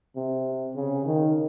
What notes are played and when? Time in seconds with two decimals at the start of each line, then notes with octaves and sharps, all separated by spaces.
0.16 C3
0.76 C#3
1.06 D#3